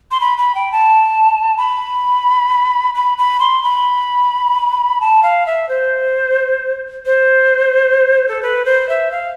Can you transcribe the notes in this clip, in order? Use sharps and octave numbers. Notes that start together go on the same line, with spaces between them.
C6
B5
B5
G5
A5
B5
B5
B5
C6
B5
A5
F5
E5
C5
C5
A4
B4
C5
E5
F5